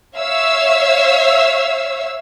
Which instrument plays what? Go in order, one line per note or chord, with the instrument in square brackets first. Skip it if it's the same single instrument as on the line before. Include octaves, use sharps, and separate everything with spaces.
[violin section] C#5 E5 F5 E6